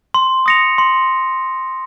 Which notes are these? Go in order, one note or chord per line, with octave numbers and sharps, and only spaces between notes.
C6
D#6 A#6 C#7 F7
C6